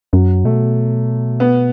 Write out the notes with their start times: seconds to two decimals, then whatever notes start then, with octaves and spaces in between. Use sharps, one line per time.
0.13 F#2 F#3
0.44 B2 A3
1.40 B3